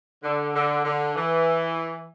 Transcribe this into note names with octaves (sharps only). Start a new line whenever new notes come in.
D3
D3
D3
E3